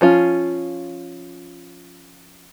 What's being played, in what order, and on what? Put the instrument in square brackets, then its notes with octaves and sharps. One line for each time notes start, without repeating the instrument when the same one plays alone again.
[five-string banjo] F3 C#4 F4